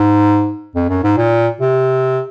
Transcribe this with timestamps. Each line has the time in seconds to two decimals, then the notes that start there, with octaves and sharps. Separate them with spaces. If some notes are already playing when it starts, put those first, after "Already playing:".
Already playing: G#2
0.75 F2
0.89 F#2
1.03 G#2
1.17 A#2
1.61 C3